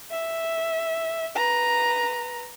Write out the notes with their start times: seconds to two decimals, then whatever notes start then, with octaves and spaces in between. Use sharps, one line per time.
0.11 E5
1.35 B4 A#5